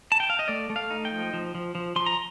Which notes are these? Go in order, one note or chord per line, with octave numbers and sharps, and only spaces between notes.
A5
G5
F5
D#5
A3 D5
A3
F5
D#4
G5
F3
F3
F3
F3
F3 C6
A#5